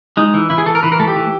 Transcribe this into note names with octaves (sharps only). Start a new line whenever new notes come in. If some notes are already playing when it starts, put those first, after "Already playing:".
G#3 D#4
E3
E3 E4
G#4
E3 A4
A#4
E3 B4
A#4
A3 A4
G4
E3